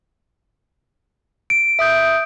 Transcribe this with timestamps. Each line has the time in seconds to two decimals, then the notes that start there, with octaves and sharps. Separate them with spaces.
1.50 D7
1.79 E5 D#6 G6